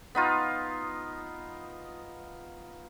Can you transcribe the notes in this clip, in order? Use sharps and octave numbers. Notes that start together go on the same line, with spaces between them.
B3 D#4 F4